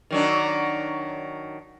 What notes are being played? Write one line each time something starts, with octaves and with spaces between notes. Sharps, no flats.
D#3 F#3 D4